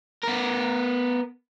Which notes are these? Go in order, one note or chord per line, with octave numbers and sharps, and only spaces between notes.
B3 A#4